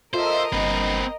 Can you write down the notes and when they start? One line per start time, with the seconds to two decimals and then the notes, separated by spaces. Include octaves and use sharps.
0.14 F4 A4 A#4 C5 D#5 E5
0.52 G1 C4 B4